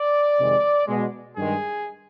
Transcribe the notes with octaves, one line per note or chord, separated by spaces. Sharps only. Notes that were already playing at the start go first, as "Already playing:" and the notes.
Already playing: D5
F2 C3 D#3 G#3
B2 G#3
G2 D#3 G#3 G#4